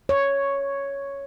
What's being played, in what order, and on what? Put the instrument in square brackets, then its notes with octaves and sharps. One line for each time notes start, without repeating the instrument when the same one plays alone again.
[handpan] C#5